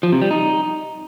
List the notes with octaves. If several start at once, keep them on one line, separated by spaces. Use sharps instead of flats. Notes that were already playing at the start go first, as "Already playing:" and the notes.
F3
C3
G3
D#4